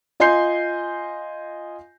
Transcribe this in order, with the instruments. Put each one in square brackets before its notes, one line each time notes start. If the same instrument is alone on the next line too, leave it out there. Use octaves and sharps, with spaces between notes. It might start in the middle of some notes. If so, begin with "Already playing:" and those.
[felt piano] F4 D#5 G#5 C6 G6 C7